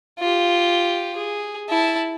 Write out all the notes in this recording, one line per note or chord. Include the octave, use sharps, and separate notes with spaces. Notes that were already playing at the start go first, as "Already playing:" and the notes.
F4 G4
G#4
E4 A5